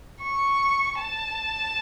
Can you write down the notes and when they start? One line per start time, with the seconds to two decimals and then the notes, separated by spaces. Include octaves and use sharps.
0.23 C#6
1.01 A5